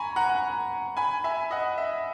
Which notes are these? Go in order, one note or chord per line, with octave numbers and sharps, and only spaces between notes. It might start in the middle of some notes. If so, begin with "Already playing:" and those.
Already playing: G#5 A#5 B5 C#6
F#5 A#5
G#5 B5
E5 G#5
D#5 F#5
E5